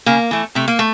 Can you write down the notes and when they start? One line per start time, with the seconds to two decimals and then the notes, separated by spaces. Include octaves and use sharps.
0.06 C#3 A#3
0.31 E3 A3
0.55 C3 A3
0.68 A#3
0.79 A3